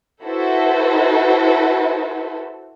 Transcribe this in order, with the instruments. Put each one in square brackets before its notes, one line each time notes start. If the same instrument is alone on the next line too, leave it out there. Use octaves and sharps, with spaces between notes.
[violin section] E4 F#4 A4 B4 C5